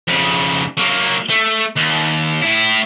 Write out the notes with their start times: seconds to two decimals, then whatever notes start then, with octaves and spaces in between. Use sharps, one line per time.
0.08 F2 C#3
0.78 F#3 A#3
1.29 A3
1.76 D#2
2.42 A2 E4